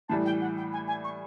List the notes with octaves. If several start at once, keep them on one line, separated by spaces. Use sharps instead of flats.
A2 E3 G3 A5
G5
F#5
G5
G#5
G#5
C#6